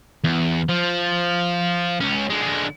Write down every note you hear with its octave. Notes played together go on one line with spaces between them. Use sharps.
E2
F3
C#2 C#4
D3 G#3